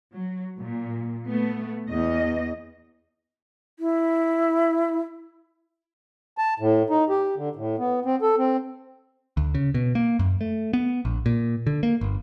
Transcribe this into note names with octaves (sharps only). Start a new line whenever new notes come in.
F#3
A#2
A3 B3
E2 D#5
E4
A5
A2
D#4
G4
D3
A2
B3
C4
A4
C4
D2
C#3
B2
A#3
F#2
A3
B3
A#1
A#2
D3
A#3
G1